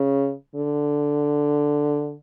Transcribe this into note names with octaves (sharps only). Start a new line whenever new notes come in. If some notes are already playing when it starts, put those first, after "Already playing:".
Already playing: C#3
D3